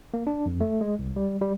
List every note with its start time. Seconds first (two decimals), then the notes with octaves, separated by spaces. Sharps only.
0.14 A#3
0.27 D4
0.46 F2
0.61 A3
0.81 G#3
0.99 C2
1.16 G3
1.41 G3